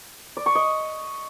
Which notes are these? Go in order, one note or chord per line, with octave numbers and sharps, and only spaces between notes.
D5
C#6
D#5